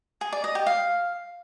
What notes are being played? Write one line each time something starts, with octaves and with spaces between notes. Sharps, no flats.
G#4
D5
D#5
G4
F5